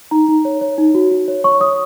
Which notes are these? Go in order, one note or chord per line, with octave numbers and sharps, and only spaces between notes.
D#4 A#5
D#4
C#5
C#5
D#4
F#4
F#4
C#5
C#5 C#6
C#5 D#6